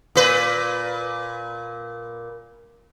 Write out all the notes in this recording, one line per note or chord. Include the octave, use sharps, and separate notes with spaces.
A#2 B4